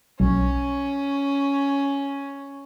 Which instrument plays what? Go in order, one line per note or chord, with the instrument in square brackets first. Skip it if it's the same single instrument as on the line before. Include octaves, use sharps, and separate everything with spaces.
[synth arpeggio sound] B1 [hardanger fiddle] C#4